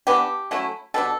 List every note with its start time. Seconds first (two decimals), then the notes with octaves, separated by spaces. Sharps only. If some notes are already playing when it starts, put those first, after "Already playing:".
0.07 E3 B3 D4 G4
0.51 F#3 A3 C#4 E4
0.94 B2 G3 D4 A4